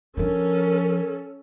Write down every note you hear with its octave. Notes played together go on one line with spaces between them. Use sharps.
F3 C#4 D4 A4 A#4